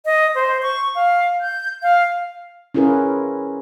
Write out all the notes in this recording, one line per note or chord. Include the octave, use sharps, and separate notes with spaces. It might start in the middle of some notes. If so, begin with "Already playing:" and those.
D#5
C5
C#6
F5
G6
F5
C#4 E4 F4 G#4 A#4 B4